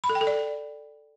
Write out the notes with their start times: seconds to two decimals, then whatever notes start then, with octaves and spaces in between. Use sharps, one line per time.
0.04 B5
0.09 A4
0.15 G5
0.21 A4
0.27 D5